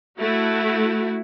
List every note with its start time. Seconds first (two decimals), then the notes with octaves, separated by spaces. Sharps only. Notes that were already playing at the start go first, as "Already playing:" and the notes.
0.18 A3 E4 F#4